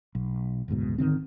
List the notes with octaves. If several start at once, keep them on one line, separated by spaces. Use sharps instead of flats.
B1
F#1 D2 G#2 B2
G#1 D3 D#3 C4